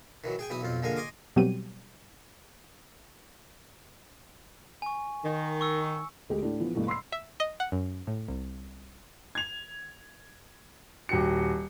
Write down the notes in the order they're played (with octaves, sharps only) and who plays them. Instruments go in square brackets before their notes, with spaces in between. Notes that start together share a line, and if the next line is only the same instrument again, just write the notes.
[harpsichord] D#3 E3 F#3
G#4 G5 G#5
B1 E3 E4 D#6
B1 F2 F4
A#1 D3 G#3 A#4 F5 G#5
D#5 G#5 C6 D6 D#6
[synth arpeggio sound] B2 F#3 G3 C4 G4 D#7
[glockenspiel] G#5 C#6
[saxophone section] D#3
[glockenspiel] C#6 E6 C#7
[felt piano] D2 G#3 G4 G#4
A2 D4
E3 F3 B3
G2 B2 E3 A3 A#3
B5 C6 E6 C7
[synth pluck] E5
D#5
F#5
F#2
A2
C2
[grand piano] G#6 F7
D#1 F#4 G4 C#7